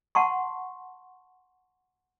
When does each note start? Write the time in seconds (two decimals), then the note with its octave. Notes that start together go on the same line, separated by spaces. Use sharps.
0.15 F#5 A5 C6 C#6